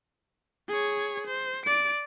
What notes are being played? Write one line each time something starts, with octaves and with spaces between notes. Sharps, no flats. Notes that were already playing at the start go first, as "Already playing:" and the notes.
G#4 C#5
C5
D5 D7